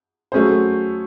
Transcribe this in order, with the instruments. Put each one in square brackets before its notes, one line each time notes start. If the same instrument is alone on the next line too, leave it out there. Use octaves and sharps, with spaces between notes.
[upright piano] F#3 A3 C#4 G#4 C5